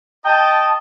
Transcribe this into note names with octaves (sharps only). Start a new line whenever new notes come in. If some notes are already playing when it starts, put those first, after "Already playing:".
D#5 G5 A5